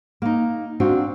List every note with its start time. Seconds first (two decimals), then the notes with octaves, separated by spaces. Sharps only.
0.22 A#3 D#4
0.80 C4 D4 F4 F#4